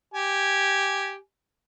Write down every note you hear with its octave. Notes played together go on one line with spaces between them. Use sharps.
G4 G#5